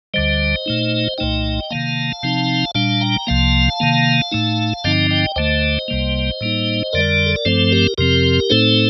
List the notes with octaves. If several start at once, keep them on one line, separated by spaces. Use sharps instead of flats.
D2 D3 G3 C5 D#5
A#2 A3 D#4
C2 A#2 A3 D#4 D#5 G5
C3 D#3 A#3 F5 A5
C3 F3 C4 D#4
A#2 G3 D4 F5 A5
G5 A#5
C2 C3 F3 A#3 F5 A5
C3 D#3 A#3
A2 A3 D#4
G2 D3 F3 C4 D#4 D#5 G5
D#5 G5
D2 D3 A3 C5 D#5
C2 C3 G3 A#3
A2 G3 A#3 D#4
F2 D3 G3 A#4 D5
A4
A#4
G2 F3 A3 C4 A4 C5
G4 A#4
F2 C3 F3 C4 G4 A#4
A2 A3 C4 D#4 A4 C5